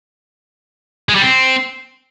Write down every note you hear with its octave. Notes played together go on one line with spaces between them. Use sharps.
G#3
G3
C4